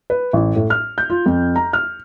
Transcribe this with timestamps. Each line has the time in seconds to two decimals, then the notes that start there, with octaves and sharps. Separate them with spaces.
0.10 B4
0.33 A1
0.56 A2
0.70 F6
0.98 G6
1.10 F4
1.26 F2
1.56 A#5
1.73 F6